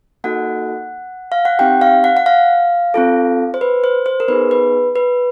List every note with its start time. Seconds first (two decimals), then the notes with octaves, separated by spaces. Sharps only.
0.24 A#3 D#4 F#4 A4 F#5
1.32 F5
1.45 F#5
1.59 C4 D#4 G4 G5
1.81 F5
2.04 F#5
2.17 F#5
2.26 F5
2.94 C4 F4 A4
3.54 C5
3.61 B4
3.84 C5
4.06 C5
4.20 A#4
4.28 B3 D#4 G#4 B4
4.51 B4
4.96 B4